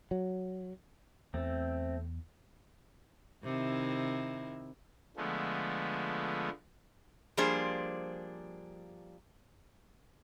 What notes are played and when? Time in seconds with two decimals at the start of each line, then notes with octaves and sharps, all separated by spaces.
0.11 F#3
1.34 E2 A3 C4
3.44 C3 D#3 E4
5.17 D3 F3 G#3 A3 B3
7.37 F3 G3 A#3 D4 G#4 C5